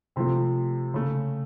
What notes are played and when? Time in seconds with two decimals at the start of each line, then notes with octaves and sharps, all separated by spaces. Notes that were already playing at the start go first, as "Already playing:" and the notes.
0.16 C3 F3 A3 C4
0.94 C#3 A3